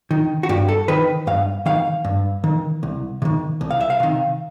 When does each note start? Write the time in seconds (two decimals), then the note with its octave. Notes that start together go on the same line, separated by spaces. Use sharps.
0.11 D#3
0.43 F#4
0.49 G2 G4
0.69 A4
0.88 D#3 B4
1.27 G2 F5
1.66 D#3 F5
2.04 G2
2.44 D#3
2.83 C2
3.22 C3
3.25 D#3
3.61 C2
3.71 F5
3.81 E5
3.90 F5
4.00 C3 D#3